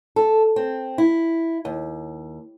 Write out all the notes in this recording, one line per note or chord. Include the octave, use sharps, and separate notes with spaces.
A4
C4
E4
D#2